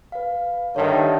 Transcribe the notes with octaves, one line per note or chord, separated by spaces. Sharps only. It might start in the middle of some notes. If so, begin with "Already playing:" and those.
B4 F5
G2 D3 D#3 C#5 E5 A5